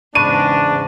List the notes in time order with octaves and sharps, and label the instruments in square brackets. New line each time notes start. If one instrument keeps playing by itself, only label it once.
[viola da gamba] E2 G#2 C#3 [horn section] D4 [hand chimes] D5 B5 C#6 [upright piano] D#7